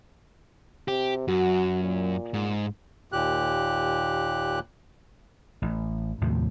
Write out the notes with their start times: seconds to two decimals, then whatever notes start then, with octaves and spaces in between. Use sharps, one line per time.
0.88 C3 G4
1.28 F#2 F#4
1.83 A#2
2.34 G#2
3.12 D#2 A#2 G4 F#6
5.62 A1
6.21 D#2 A2 C3 F3